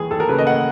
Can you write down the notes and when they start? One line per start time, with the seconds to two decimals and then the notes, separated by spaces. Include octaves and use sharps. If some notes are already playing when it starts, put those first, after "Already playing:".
Already playing: D#2 E3 G#4
0.11 D#2 A4
0.20 A#4
0.28 C#3 B4
0.38 D#5
0.47 F#5